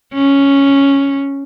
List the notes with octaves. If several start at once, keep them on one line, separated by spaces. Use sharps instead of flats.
C#4